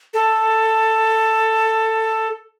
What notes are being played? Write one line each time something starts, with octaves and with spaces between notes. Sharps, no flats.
A4